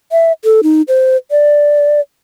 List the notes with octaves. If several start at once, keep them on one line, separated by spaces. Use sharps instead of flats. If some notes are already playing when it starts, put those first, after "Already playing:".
E5
A4
D#4
C5
D5